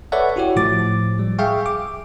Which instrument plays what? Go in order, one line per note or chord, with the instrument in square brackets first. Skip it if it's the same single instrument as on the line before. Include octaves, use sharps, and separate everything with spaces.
[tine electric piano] A4 B4 C#5 D5 E5 F#5
E4 F#4 G4 C#5
A2 F3 D6 A6
G3
G#4 E5 F5 G5 C#6
D6